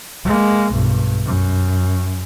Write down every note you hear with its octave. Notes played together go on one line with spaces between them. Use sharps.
G#3 A#3
B1 G2
F#2